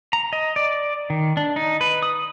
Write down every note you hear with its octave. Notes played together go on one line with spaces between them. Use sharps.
A#5
D#5
D5
D#3
D4
D#4
B4
D#6